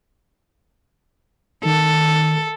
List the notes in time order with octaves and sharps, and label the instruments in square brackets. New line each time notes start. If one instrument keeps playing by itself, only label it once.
[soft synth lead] D#3 [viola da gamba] A4